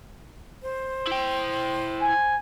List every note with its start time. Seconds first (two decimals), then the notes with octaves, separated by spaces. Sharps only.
0.62 C5
1.07 E4 G5
2.01 G#5